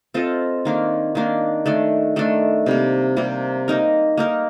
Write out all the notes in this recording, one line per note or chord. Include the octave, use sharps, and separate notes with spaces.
C4 F4 A4 D#5
D#3 A#3 D4
D#3 A#3 D4
D#3 A3 D4
D#3 A3 D4
C3 G3 A#3
C3 G3 A#3
A#3 D#4 A#4
A#3 D#4 A#4